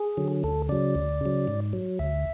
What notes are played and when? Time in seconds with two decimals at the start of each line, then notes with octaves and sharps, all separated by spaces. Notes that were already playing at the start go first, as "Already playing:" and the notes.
Already playing: G#4
0.17 D3 F#3
0.44 D2 A4
0.69 C#3 F#3 D5
0.95 D2
1.21 C#3 F#3
1.47 G#2
1.73 F#3
1.99 D2 E5